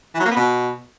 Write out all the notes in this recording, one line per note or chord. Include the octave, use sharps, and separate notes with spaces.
E3
F#3
A#3
B3
B2